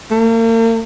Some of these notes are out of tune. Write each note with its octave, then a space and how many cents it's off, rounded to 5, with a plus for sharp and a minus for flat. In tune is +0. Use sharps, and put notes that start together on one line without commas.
A#3 -40